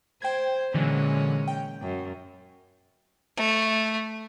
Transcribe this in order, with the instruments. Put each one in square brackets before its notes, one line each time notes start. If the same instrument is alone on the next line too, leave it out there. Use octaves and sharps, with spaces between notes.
[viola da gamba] C5 [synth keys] G5 G#6
[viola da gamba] A#2 G#3 C#4 [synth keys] D3 E3 F#3
[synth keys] G5
[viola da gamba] F#2
[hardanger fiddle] A3